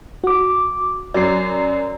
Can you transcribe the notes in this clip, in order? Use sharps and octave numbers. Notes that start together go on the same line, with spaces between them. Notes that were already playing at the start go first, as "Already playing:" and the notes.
F#4 D6
F#2 F#3 D5 C7